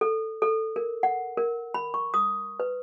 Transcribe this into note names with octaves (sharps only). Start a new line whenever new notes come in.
A4
A4
A#4
F#5
A#4
B5
C#6
D#6
B4